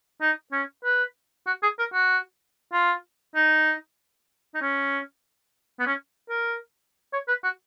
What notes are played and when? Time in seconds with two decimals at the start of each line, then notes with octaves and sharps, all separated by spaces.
0.21 D#4
0.53 C#4
0.84 B4
1.47 F#4
1.63 G#4
1.79 A#4
1.94 F#4
2.73 F4
3.35 D#4
4.54 D#4
4.62 C#4
5.79 B3
5.87 C#4
6.29 A#4
7.13 C#5
7.28 B4
7.44 F#4